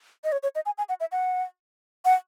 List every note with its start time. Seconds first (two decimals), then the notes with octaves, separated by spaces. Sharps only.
0.24 D#5
0.32 C#5
0.43 C#5
0.55 D#5
0.66 G#5
0.78 G#5
0.89 F#5
1.00 E5
1.12 F#5
2.05 F#5